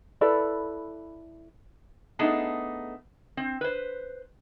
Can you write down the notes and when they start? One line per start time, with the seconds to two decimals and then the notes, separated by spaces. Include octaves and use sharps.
0.21 E4 A4 B4 D5
2.19 A3 B3 D4 D#4 G#4 A5
3.37 C4
3.61 B4 C5